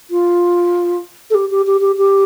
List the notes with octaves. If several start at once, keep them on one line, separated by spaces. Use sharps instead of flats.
F4
A4
G4
G4
G4
G4
G4